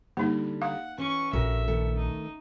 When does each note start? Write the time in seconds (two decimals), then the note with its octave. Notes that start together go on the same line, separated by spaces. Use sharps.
0.17 D3 G3 A#3 D#4
0.62 F5 F#5
0.98 E3 C#4 C#6
1.33 A#1 F#4 A4 A#4 E5
1.68 D#3 A3 A4
1.97 D#4